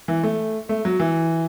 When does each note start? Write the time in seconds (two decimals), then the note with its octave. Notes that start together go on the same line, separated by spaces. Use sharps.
0.08 E3
0.23 A3
0.69 A3
0.85 F#3
1.00 E3